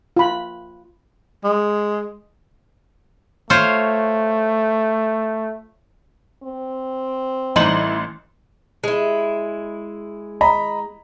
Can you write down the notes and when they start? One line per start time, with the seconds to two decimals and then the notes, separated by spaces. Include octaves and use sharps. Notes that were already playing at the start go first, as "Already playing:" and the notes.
0.17 F4 B5
1.44 G#3
3.50 A3 F4 C5 C#5
6.43 C4
7.56 A1 E3 D#4 C6 F#7
8.84 G#3 E4
10.41 D#5 A#5 B5